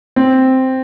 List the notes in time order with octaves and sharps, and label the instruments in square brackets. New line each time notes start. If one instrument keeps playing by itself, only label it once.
[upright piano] C4